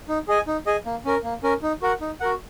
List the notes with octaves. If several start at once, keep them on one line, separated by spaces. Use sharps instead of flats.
D#4
G#4 D#5 G#5
D#4
G#4 D#5 G#5
A#3
C#4 A#4
A#3
C#4 A#4
D#4
F#4 A#4 F#5
D#4
F#4 A#4 F#5